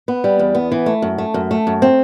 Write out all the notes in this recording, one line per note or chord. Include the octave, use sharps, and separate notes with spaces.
B3
G3
E2
B3
E3
A3
F#2
A3
F#2
A3
F#2
C4